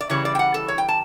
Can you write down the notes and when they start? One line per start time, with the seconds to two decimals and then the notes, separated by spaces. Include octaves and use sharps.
0.01 D5
0.10 C#3 E3 G3 C#5
0.25 D5
0.35 G5
0.39 F#5
0.54 A4
0.68 C#5
0.78 G5
0.88 A5